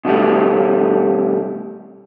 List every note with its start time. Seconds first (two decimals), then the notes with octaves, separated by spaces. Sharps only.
0.05 B2 D#3 G3 A3